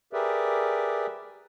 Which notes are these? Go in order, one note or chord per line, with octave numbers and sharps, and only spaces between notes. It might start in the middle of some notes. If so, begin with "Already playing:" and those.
G4 G#4 A#4 B4 D5 E5